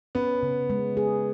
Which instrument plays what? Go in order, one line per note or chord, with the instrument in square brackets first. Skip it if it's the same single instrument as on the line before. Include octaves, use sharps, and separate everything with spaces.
[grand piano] B3 [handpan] C#4
[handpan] C#3
G#3
G#4